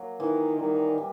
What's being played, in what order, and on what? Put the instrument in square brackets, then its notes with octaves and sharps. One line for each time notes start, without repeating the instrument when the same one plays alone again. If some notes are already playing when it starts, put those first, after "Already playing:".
Already playing: [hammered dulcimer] F#3 A#3
[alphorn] D#3 [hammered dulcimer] E3
[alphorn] D#3 [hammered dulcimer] G3
[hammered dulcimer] G3